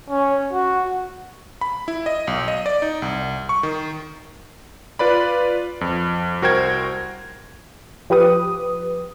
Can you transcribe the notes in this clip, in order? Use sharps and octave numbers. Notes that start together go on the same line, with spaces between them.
C#4
F#4
B5
E4
D#5
B1
D#5
D5
D#4
C2
C#6
D#3
F4 B4 D5 B5
F2
C2 F#4 A#4 C5 G5 G#6
F3 G4 B4 D#6